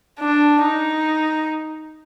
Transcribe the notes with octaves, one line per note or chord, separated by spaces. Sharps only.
D4
D#4